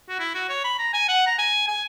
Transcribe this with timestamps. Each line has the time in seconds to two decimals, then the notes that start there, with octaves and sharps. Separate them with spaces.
0.08 F#4
0.19 E4
0.34 F#4
0.49 C#5
0.64 B5
0.79 A#5
0.93 G#5
1.08 F#5
1.26 A#5
1.38 G#5
1.67 G#5